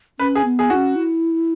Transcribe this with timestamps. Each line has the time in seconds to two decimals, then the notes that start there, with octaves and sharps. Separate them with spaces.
0.19 C#4 B4
0.35 G#4
0.45 B3
0.59 G#4
0.70 E4 F#4
0.75 C#4
0.96 E4